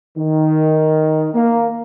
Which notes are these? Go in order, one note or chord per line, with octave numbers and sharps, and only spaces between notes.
D#3
A#3